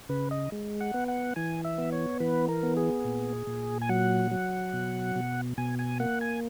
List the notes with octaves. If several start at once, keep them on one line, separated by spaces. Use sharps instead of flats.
C#3 B4
D#5
G#3
F#5
B3
F#5
E3 G#5
E5
B3
C#5
E3 B4
A#4
B3
G#4
A#2
A#2
G#5
F#3 F#5
F#3
B2
B2
B2 G#5
G#5
A#3 F#5
G#5